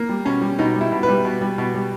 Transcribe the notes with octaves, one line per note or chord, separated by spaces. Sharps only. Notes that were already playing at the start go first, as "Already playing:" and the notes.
Already playing: A#3
G3
B2 C#4
G3
B2 D#4
G3
E4
B2
B4
G3
B2
G3
B2
G3